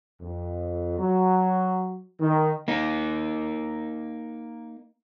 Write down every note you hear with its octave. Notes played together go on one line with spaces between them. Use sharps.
F2
F#3
D#3
A#3 D#4